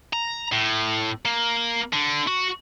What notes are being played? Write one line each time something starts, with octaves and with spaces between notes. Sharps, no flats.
A#5
A2
A#3
D3
F#4